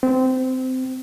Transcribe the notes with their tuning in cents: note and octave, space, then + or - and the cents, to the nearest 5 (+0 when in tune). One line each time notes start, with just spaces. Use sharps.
C4 -20